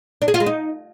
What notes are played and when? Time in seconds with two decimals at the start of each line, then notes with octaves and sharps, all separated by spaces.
0.22 D4
0.28 G#4
0.34 F4
0.40 G#3
0.46 D#4